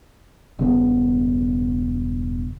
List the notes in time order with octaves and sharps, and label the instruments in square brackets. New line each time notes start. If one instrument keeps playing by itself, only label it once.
[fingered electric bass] E1 G2 C#3 B3